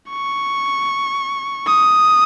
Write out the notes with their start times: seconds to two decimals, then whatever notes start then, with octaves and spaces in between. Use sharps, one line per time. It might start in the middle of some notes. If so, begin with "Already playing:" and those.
0.10 C#6
1.67 D#6